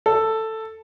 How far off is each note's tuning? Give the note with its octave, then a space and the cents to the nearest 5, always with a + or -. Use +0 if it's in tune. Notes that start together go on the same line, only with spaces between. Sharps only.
A4 +10